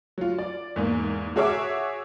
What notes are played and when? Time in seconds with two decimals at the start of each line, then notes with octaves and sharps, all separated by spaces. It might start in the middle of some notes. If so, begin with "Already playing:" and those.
0.18 F#3 F4
0.38 D5
0.76 E2 G#2 A#3
1.36 F#4 G#4 C#5 E5 D6 E6